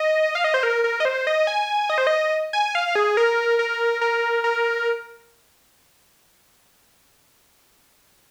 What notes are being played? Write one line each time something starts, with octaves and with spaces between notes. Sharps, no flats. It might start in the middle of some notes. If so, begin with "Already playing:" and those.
Already playing: D#5
F5
D#5
C5
A#4
A#4
D#5
C5
D#5
G#5
D#5
C5
D#5
G#5
F5
G#4
A#4
A#4
A#4
A#4